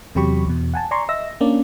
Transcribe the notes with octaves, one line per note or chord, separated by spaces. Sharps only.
E2 C3 F#3 G4 B5 C#6
E2 B2
F#5 G#5 A5
D5 G#5 A#5 C6 C#6
D#5 E5 E6 A#6
A#3 C#4 D4 D5